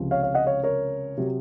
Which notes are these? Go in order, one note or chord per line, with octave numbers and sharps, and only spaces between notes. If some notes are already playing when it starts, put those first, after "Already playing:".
Already playing: C#2 C3 F3
C#5 F5
C#5 F5
D#5 F#5
C#5 F5
A#4 C#5
C3 F#3